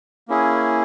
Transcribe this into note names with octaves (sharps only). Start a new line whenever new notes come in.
A#3 C#4 E4 G#4